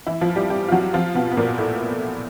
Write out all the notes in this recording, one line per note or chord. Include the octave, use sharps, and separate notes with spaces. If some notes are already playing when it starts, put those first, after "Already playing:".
E3 E4
F3 F4
G3 G4
G3 G4
F4
F#3 F#4
F3 F4
B2 B3
B3
A#2 A#3
A2 A3